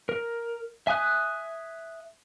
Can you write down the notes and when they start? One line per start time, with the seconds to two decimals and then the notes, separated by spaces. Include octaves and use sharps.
0.09 A#4
0.87 E5 G#5 D#6 F#6